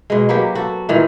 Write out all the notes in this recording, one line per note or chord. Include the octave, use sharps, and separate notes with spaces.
B2 G#3
F#3 A#3 B3 G4
F#4 A4
A#2 D#3 E3